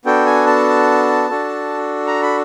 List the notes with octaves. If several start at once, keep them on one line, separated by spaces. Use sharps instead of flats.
B3 D4 F#4 A4 G5
G#5
A5
D4 F#4 A4
A#5
B5